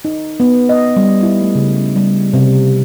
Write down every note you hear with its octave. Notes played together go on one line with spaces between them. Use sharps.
D#4
B3
D#5
G3
E4
A3
C#3
G3
C3